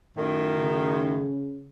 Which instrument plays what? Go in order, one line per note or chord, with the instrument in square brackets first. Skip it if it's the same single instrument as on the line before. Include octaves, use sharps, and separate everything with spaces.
[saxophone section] F#2 A2 D#3
[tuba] C#3